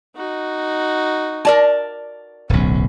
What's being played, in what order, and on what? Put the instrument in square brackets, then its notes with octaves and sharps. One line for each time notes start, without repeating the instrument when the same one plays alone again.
[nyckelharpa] D#4 F#4
[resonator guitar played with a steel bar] A#4 D5 A5
[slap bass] D1 B1 [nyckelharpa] C#4